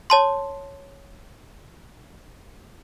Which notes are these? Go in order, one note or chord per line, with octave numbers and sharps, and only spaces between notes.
C#5 A5 C6